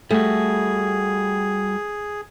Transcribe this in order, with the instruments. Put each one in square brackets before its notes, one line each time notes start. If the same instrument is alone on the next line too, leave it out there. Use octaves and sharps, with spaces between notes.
[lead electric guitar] G3 F#4 [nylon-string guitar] A3 [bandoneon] G#4